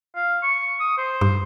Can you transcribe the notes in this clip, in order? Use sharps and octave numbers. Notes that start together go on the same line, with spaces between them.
F5
C#6
D#6
C5
G2